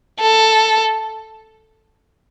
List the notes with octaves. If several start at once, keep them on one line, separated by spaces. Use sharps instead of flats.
A4